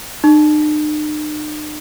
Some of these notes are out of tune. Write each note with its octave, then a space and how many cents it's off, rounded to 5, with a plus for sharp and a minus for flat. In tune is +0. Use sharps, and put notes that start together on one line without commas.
D#4 -45